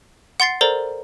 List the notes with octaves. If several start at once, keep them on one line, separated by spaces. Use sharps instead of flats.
F#5 C6 A6 C7
A4 A#4 C5 D5 A#5